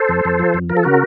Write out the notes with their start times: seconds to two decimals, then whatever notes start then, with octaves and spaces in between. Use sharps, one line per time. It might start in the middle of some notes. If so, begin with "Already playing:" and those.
Already playing: A4 C5
0.09 F2
0.25 F2
0.39 F3
0.54 F2
0.69 F3 A#4
0.77 A4
0.83 C#3 F#4 A#4